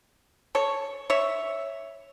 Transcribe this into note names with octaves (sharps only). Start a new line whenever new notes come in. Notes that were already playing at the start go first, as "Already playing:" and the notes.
A4 C#5
C#5 E5